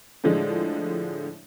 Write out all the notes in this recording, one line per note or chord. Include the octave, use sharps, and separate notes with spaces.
A2 D3 F3 G#3